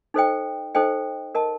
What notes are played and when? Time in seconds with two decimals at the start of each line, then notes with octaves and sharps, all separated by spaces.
0.14 D#4 A4 C5 D#5 G5
0.75 D#4 A4 C5 D#5 G5
1.35 A#4 D#5 A5